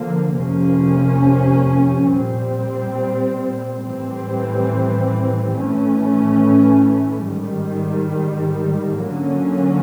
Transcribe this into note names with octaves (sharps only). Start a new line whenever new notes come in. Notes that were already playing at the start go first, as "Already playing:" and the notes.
Already playing: D3 F3 A#3
F2 C3 F3 A#3 C#4
A#2 G3 C4
A2 E3 G3 C4
A2 E3 A3 C#4
G#2 D#3 G3
D3 F#3 A#3 C#4